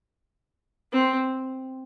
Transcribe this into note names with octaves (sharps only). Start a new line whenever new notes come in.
C4